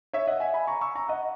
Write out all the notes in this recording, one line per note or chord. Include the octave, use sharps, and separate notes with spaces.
C#5 E5
D#5 F#5
E5 G#5
G#5 B5
A#5 C#6
C#6 E6
A#5 C#6
D#5 F#5